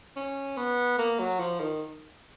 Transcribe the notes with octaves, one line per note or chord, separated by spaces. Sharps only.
C#4
B3
A#3
F#3
F3
D#3